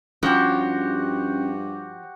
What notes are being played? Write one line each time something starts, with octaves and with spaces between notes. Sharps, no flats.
G2 F3 C#4 F#4 G4